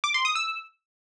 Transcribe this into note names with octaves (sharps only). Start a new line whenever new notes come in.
D6
C6
D#6
E6